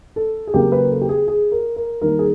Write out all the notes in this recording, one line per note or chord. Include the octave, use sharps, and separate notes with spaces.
A4
G#4
C#3 F#3 A#3 G4
B4
A4
G4
G#4
G#4
A#4
A#4
D#3 G3 A#3 A#4
G#4